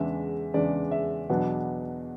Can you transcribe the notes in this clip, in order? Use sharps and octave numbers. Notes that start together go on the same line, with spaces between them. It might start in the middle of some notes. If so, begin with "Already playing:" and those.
Already playing: E2 C#3 G#3 D4 E5
E2 C#3 G#3 D4 D5
E5
E2 B2 F#3 B3 D4 F#5